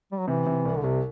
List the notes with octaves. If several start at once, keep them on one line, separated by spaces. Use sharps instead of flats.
G3
F#3
C3 E3
C3
C2
D3
C2 C3